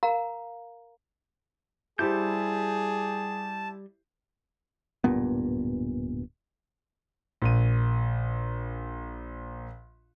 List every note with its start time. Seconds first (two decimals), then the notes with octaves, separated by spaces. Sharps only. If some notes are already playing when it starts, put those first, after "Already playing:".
0.03 A#4 F5 A#5
1.99 G3 E4 G4 G#4 C5 A5 G6
5.04 D1 G2 A#2 B3
7.42 A#1 D#7